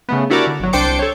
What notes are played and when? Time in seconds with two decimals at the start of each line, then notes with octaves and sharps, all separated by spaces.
0.09 C#3 A3 B3
0.30 D4 E4 F#4 G4 A#4 D5
0.47 D3
0.60 G1 F#3
0.73 C2 D4 C5 G5 D6 C#7
0.99 A4 C#5